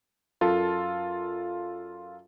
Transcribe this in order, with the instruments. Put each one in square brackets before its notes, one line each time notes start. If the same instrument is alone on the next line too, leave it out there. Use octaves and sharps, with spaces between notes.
[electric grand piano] F#2 F4 A4 A#4 A5